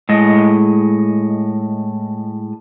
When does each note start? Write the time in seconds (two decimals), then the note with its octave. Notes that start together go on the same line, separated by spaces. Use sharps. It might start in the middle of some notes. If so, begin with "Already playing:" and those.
0.09 A2 G#3 D#5